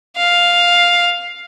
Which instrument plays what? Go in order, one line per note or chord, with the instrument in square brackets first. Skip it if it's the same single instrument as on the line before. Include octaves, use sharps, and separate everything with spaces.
[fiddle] F5